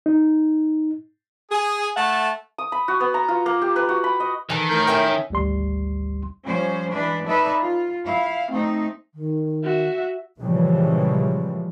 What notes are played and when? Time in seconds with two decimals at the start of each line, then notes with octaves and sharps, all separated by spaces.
0.06 D#4
1.51 G#4
1.96 A3 A4 E5 F#5 A5
2.58 D#6
2.72 B5
2.88 F#4
3.00 B3
3.14 A#5
3.28 F4
3.46 A#3
3.62 G4
3.76 B4
3.89 F#4
4.04 B5
4.20 D#5
4.50 D#3 E3 A4
4.69 A2 A#4 G6
4.87 C#4 E5 G5
5.30 G#1 D2 G3 C6
6.45 F3 G3 C#4 C5
6.91 E3 G#3 D4 B4
7.27 D#4 A4 B4 D5 E5
7.61 F4
8.06 E4 F5
8.51 A3 C4 D#4
9.14 D#3
9.64 F#4 E5
10.41 A#2 C#3 E3 F3 G3 G#3